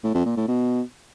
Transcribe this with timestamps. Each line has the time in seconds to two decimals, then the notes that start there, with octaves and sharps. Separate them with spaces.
0.04 A2
0.15 F2
0.26 A#2
0.37 A2
0.48 B2